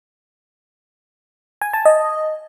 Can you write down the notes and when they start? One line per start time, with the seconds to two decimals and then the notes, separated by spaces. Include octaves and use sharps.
1.61 G#5
1.73 A5
1.85 D#5